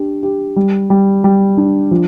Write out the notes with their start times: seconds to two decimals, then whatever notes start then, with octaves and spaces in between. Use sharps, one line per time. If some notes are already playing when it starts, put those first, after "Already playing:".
Already playing: D4 G4
0.23 G4
0.56 G3
0.90 G3
1.24 G3
1.57 D4
1.91 F3